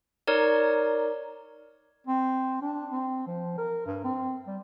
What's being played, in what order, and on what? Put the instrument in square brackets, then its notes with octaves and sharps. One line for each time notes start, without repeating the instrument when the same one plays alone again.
[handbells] D#4 A#4 C#5 D5
[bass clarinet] C4
D4
C4
F3
A#4
G2
C4
G3